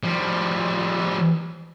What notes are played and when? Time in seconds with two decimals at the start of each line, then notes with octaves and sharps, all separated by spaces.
0.03 F3 G3